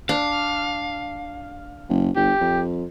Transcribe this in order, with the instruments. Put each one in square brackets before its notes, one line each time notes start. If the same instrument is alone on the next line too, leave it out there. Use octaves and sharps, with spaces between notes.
[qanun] D4 [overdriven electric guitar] F5
[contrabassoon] F#1
[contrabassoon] G1 [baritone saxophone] G4
[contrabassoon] F2